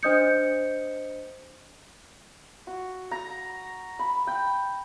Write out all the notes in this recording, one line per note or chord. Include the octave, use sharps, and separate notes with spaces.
D4 C5 D#5 D#6 G6 C#7
F#4
A#5
B5
G5